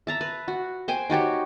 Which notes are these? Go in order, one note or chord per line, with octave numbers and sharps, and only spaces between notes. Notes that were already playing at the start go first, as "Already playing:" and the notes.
E5 A5 A#5
B4
F#4
C5 G5 G#5
D#4 F#4 G4 C#5